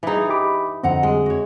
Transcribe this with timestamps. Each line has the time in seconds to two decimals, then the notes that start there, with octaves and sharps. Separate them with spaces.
0.03 E3 D4 D#4 G#4
0.29 G4 B5 D6
0.83 F2 D3 C4 D#5 F#5 A#5
1.03 G#3
1.26 F#4 C#5